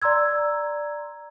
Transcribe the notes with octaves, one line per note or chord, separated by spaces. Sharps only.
D5 A#5 C6 E6 G#6